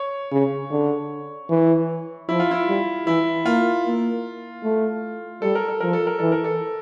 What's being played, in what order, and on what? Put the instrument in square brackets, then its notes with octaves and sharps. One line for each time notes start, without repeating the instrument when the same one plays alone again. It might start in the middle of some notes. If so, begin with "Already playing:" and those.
Already playing: [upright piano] C#5
[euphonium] C#3
D3
E3
[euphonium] F3 [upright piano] E4
[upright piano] F4
E4
[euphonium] G3
[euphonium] E3 [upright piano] E4
[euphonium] A#3 [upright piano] F4
[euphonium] A#3
A3
[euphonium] G3 [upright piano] A4
[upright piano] A#4
A4
[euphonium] F3 [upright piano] A#4
[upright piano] A4
A#4
[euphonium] E3 [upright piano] A4
[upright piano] A#4
A4